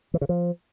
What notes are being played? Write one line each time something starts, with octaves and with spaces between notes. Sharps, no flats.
E3
C#3
F3